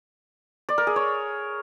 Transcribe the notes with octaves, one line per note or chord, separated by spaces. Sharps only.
D5
A#4
G#4
C#5